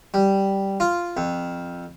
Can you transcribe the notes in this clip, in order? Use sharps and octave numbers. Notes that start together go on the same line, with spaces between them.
G3
F4
F2